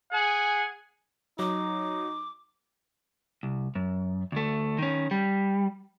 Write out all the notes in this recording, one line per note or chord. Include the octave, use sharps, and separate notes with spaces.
G#4 F#5 G#5
F#3 D#4 D6
C2
F#2
D2 A3
D#3 C#4
G3